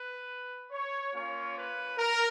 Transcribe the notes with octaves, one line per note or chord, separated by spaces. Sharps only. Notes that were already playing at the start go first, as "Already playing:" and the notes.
Already playing: B4
C#5
A#3 C#4 F4 C#5
B4
A#4